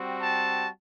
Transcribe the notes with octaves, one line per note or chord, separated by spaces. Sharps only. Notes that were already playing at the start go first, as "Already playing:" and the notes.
Already playing: G3 C4 F#4
A5